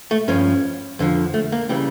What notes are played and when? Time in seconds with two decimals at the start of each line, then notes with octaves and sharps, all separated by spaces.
0.11 A3
0.28 G2 F3 C#4
0.99 F2 D3 F3
1.34 A3
1.52 A#3
1.69 C#3 E3 G3